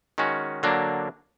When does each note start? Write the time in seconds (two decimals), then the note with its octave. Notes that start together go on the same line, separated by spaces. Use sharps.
0.18 D#3 G#3 C#4 F#4
0.63 D3 F#3 A#3 D4